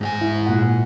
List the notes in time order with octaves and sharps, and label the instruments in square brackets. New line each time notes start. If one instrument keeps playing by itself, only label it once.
[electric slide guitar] G#2 G4 G#5
[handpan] E4
A#2 F#5